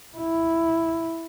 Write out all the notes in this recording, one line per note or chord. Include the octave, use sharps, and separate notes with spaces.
E4